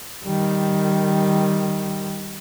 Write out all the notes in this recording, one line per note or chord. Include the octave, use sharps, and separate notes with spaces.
D#3 G3